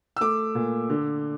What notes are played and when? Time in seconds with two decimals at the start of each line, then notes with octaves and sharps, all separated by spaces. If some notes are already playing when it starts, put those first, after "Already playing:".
0.17 E6
0.21 A3 D6
0.55 A#2
0.90 D3